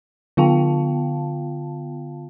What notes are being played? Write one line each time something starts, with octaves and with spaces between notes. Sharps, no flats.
D3 B3 F4 F5 G5 A5